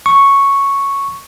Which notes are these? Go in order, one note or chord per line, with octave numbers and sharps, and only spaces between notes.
C#6